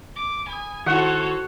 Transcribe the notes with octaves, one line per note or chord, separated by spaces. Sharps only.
D6
G#5 B5 D#6
D#3 E4 F#4 A4 C5 C#5 F#5